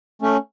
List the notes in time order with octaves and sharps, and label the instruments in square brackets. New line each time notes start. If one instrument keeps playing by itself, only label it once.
[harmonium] A3 C#4